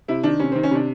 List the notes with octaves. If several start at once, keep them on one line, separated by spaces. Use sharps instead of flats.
C3 E4
D#3 D4
C3 C#4
D#3 C4
C#4
C3 D4